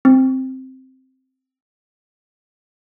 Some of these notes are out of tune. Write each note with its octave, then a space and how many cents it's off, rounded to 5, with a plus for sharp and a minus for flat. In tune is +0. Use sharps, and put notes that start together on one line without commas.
C4 +0